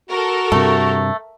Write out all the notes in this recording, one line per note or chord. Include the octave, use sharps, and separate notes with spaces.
F#4 A4 A#4
G2 C3 A3